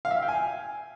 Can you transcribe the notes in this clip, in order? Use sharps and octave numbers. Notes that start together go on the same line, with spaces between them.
F5
E5
F5
G5
G#5